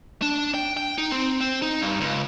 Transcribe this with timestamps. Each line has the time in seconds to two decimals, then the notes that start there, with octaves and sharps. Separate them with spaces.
0.22 D4
0.54 G5
0.77 G5
0.98 D#4
1.11 C4
1.41 C4
1.62 D#4
1.81 G2
2.01 C#2